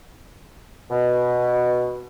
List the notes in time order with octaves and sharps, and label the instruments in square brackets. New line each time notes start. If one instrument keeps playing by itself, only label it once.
[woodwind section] B2